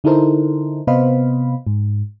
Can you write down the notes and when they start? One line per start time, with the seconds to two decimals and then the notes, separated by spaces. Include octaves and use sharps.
0.04 D3 D#4 E4 A4 A#4 C5
0.87 C3 B3 C5 D#5 F5 B5
1.67 G#2